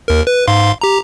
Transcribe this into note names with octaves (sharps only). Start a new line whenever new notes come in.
D#2 A#4
B4
G#2 F5 C6
G4 A#5